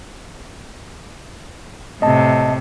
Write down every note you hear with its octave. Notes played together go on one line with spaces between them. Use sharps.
A2 C3 D#5 A5